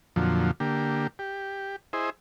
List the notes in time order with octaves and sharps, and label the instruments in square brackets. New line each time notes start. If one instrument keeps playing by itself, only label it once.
[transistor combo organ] F2 A#2 D3 F3 F#3
D3 A#3 G4
G4
E4 G#4 C5 D#5